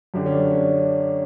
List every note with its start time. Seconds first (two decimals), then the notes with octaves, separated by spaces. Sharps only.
0.14 F#2 D3 G4
0.26 C#4
0.32 D4
0.51 C#4